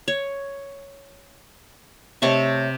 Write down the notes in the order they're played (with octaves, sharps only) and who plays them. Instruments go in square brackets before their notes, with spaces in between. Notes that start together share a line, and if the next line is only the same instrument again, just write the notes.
[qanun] C#5
[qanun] C3 A5 C#6 [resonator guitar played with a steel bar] A3 C#5 D#5